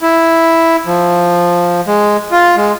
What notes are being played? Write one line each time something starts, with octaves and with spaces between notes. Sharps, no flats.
E4
F3
G#3
F4
G#3